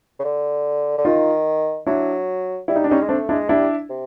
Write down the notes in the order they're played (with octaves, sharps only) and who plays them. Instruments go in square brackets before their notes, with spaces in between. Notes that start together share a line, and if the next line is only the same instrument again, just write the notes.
[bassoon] C#3
D3
D3
[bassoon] D#3 [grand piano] D#4 F4
[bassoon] F#3 [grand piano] D4 E4
[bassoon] G3 [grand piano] E4
[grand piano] D#4
D4
[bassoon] G3 [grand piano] C#4 D#4
[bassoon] G#3
[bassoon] A3 [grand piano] C4 D4
[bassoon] G#3 [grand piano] D4 E4
[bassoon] G3 [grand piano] D4 E4
[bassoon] C3